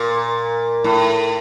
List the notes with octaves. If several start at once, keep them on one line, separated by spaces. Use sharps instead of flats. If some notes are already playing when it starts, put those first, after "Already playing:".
Already playing: A#2
A2